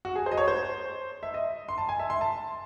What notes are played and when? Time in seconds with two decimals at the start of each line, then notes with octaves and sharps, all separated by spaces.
0.05 F#4
0.15 G#4
0.26 C5
0.31 D#5
0.37 C#5
0.48 C5
1.23 E5
1.34 D#5
1.69 C6
1.78 A5
1.89 G#5
1.99 E5
2.10 C6
2.21 A5